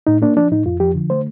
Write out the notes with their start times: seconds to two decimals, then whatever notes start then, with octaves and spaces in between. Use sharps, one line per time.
0.07 A2 D#4
0.22 A#3 D4
0.37 F3 D4
0.51 A2 D#4
0.65 F2 F4
0.80 F3 G4
0.95 D3
1.10 A3 C5